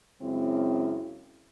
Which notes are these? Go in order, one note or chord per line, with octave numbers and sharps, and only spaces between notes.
F#2 C#3 G#3 C4 E4